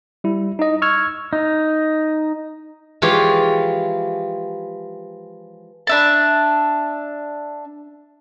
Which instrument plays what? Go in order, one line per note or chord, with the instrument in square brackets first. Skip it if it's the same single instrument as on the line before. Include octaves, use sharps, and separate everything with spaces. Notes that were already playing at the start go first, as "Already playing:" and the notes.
[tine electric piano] G3 E4
D#4 D#5
C#6 E6 F6 G#6
[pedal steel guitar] D#4
[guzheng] E3 F3 G#3 F4 G4 C#5
[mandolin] D4 E5 A5